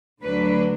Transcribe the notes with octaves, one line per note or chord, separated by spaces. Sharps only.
D2 D3 F#3 A3 D4 B4